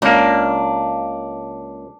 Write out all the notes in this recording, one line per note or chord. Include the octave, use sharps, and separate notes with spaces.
C#2 A#3 D4